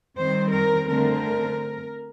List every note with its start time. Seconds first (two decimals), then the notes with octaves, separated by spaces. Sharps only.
0.17 D#3 G3 C4 C5
0.53 A#4
0.89 D3 A3 C4 A#4